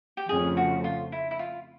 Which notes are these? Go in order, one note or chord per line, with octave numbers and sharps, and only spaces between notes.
G4
F2 C#3 F3 A3 C#4 G#4
F#4
F4
E4
E4
F4